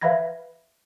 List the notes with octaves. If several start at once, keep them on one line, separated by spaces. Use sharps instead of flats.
B4 E5 F5 B5 G#6 A#6